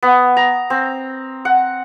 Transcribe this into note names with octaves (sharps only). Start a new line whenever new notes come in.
B3
A#5
C4
F#5